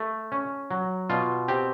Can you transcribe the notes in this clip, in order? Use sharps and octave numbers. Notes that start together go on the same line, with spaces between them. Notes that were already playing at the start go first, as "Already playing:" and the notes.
Already playing: A3
C#4
F#3
B2 F4
C4 G4